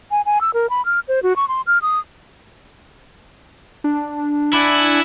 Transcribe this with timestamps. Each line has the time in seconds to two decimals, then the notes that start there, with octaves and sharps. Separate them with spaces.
0.11 G#5
0.26 G#5
0.41 E6
0.54 A#4
0.70 B5
0.85 F6
1.08 C5
1.23 F#4
1.36 C#6
1.48 C6
1.67 F6
1.82 D#6
3.84 D4
4.53 E4 D5 F#5 G#5